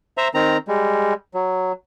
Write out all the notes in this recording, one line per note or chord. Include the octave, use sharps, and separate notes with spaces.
C5 E5 A#5
D#3 C4 A#5
G3 G#3
F#3